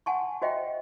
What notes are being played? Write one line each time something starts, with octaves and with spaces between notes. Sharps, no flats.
F#5 G#5 A5 C6 C#6
F#4 C5 D#5 E5 G5